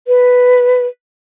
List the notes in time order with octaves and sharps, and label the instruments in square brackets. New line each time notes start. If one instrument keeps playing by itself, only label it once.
[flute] B4